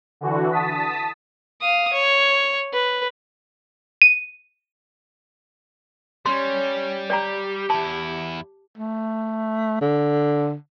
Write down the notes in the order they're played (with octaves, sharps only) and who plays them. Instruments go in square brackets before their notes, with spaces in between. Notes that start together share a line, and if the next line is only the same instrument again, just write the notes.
[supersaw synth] D3 E3 F#4
A5 D#6 B6
[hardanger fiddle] F5 D#6
C#5
B4
[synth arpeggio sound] D#7
[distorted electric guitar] G3 [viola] C#4 C#5 [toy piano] C6
[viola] G4 [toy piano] D5 G5 A#5
[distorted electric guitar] E2 E4 [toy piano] A5
[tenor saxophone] A3
D3